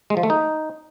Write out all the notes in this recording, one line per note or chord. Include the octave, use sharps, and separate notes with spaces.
G#3
F3
A3
D#4